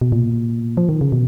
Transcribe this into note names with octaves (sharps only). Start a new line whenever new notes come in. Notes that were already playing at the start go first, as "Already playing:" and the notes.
B2
A#2
F3
D#3
C#3
B2